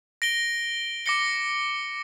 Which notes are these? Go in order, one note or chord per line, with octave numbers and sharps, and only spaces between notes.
A#6 D7 G7
D6 A#6 C#7 G7